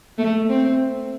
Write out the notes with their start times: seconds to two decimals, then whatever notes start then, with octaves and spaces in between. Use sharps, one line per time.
0.18 A3
0.49 C4